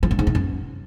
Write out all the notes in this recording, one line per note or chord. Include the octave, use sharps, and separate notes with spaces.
F3
G2
G#2
D#3
F#2